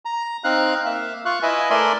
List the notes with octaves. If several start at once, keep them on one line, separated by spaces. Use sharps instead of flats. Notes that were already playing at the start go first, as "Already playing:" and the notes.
A#5
C4 D#4 F5 F#6
A#3 E5 F5
F4 F5 C#6 F#6
E4 B4 D#5 E5 G#5
A3 A#4 D5 E5 G#5 C6